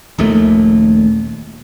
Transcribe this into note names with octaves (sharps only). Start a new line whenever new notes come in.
D#1 A#1 D#2 A3